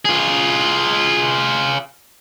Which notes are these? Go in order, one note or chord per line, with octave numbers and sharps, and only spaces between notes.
F4 G#4